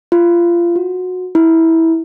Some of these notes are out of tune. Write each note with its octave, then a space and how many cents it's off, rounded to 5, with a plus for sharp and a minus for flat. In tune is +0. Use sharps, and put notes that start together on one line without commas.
F4 -25
F#4 -20
E4 -15